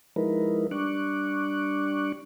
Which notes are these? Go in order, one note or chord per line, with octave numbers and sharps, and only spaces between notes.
F3 G#3 D#4 E4 A#4 B4
G3 D4 C#6 D6 F#6